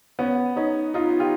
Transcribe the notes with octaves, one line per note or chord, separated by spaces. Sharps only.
B3 C#4
C#4 D#4
D#4 F4
F4 G4